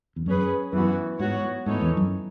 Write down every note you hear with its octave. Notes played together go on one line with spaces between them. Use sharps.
E2
F#2 C#4 G#4 B4
F#2 E3 B3 F#4
G#2 F#3 B3 F#4 C#5
G#2 E3 B3 D#4 A4 C#5
E2
F#2